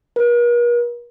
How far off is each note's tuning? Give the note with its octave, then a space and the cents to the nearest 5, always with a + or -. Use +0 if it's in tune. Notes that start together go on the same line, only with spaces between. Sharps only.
A#4 +45